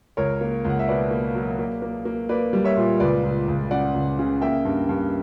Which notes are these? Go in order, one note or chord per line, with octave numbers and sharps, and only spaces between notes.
C#2 A#4 C#5
A#3
C#2 F#5
E5
B2 B4 D5
A#3
F#3
A#3
A#3
A#3
A#3 B4 D5
G3
C#5 E5
A#2
C#2 B4 D5
C#2
C#2
C#3 D5 F#5
C#2
C#3
A#3 E5 G5
G2
G2